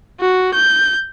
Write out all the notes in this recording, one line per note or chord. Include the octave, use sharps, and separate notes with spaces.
F#4
G6